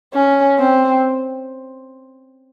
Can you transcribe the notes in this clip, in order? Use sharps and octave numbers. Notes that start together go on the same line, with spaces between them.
C#4
C4